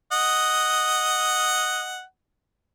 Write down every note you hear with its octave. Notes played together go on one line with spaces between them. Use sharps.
D#5 F#5